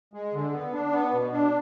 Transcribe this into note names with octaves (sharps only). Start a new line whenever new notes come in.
G#3
D3
B3
D4
B3
B2
D4